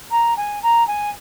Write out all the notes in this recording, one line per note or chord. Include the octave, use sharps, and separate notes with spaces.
A#5
G#5
A#5
G#5